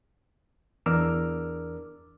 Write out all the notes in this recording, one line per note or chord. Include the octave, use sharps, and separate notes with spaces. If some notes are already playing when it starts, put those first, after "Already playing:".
E2 D4 A#4 D6 E6 F6